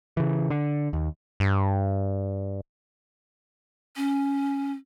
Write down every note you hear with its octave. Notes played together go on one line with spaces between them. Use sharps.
C#3 E3
D3
D#2
G2
C#4